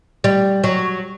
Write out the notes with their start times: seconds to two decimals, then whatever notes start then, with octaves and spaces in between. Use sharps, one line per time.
0.24 G3
0.64 F#3